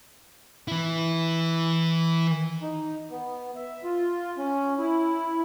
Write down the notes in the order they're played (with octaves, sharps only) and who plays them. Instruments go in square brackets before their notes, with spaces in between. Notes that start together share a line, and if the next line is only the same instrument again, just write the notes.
[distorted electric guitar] E3 E4
[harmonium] D#4
B3
E5
F4
C#4
E4